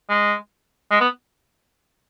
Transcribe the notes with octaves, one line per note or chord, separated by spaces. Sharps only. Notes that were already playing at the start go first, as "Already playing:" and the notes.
G#3
G#3
B3